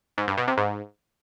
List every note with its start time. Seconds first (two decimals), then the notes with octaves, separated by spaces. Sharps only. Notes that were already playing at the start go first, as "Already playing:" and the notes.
0.18 G#2
0.28 G2
0.38 B2
0.47 C3
0.57 G#2